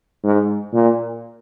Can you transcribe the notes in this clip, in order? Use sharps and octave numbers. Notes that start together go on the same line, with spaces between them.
G#2
A#2